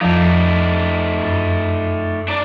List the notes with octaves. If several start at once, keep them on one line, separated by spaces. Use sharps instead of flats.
F2 F3 A3 D4 D#4
F#2
D4 D#4 D5